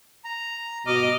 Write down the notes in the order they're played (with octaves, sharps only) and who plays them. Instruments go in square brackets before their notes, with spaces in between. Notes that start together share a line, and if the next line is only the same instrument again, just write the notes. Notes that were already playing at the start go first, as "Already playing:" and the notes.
[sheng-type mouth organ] A#5
[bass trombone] B2 [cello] D#5 [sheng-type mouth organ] D6 F6